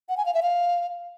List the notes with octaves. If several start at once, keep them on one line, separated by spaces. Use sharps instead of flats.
F#5
G#5
F5
E5
F5